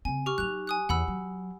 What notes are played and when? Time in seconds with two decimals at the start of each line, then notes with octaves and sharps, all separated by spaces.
0.05 C#3 C4 G#5
0.26 G4 C#6 F6
0.38 F#3 D#4 F#6 F7
0.67 G#5 D#6 F#6
0.89 E2 F#5 B5 E6
1.08 F#3